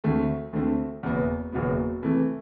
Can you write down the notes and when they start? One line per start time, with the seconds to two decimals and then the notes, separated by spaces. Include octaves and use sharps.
0.04 D2 D3 A3 C4
0.53 D2 D3 A3 C4
1.03 F#1 E2 B2 F#3 B3
1.52 F#1 E2 B2 F#3 B3
2.02 C3 E3 A3